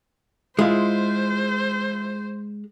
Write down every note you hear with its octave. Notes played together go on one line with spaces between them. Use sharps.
G#3 E4 F4 C5